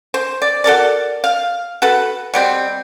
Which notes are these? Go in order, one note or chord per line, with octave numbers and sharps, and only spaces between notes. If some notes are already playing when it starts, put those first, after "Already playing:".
C5
D5
F#4 A4 A#4 D5
F5
F#4 A4 B4
B2 G3 C4